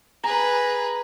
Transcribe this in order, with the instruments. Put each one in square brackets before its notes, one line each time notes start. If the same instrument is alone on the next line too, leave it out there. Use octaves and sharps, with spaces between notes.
[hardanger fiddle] G#4 B4 [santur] A#5